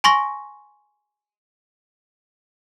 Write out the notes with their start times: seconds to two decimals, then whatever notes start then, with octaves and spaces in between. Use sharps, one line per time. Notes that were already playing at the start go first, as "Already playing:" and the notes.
0.04 G#5 C6 C#6 A#6